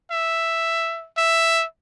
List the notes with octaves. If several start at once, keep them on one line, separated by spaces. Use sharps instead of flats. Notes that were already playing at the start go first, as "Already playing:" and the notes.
E5
E5